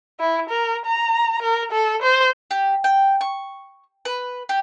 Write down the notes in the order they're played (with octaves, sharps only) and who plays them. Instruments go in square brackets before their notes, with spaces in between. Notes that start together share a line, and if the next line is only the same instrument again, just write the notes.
[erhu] E4
A#4
A#5
A#4
A4
C5
[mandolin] G4
G5
C#6
B4
G4